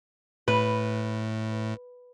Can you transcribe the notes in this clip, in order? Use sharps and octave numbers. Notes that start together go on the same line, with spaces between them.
A2 B4